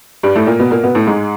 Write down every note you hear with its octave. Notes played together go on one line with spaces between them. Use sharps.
G2 G3
A2 A3
A#2 A#3
B2 B3
A#2 A#3
B2 B3
A2 A3
G#2 G#3